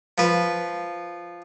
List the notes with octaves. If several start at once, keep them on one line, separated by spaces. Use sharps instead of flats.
F3 B4